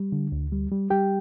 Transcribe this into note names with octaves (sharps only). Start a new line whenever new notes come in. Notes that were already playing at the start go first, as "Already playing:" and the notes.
Already playing: G3
D3
D2
G3
G3
G3 G4 G5